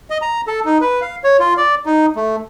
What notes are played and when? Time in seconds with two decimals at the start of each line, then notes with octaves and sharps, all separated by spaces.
0.10 D#5
0.22 A#5
0.47 A4
0.66 D#4
0.81 B4
1.02 F5
1.24 C#5
1.40 F4
1.57 D5
1.86 D#4
2.16 A3